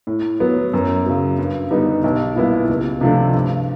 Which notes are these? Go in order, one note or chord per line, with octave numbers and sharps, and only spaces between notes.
A2
F#3 B3
F#2
C#3 F#3
G2
D3 G3 B3 D#4
B1
A#2 G3 B3 E4
C#2
C3 F3 A3 D4
G2